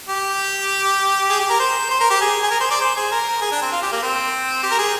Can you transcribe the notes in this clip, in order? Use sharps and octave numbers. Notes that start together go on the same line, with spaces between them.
G4
G#4
G4
A#4
C5
C5
A#4
G4
G#4
G#4
A#4
C5
D5
C5
G#4
A#4
G#4
D4
C4
F4
G4
A#3
C4
G4
A#4
G#4